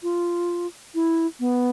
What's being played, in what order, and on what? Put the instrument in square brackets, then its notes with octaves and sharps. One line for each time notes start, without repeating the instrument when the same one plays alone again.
[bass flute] F4
E4
B3